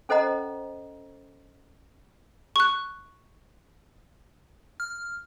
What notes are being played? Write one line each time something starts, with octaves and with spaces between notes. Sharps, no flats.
C#4 A4 C5 D#5 F#5 A#5
C#6 F#6
F6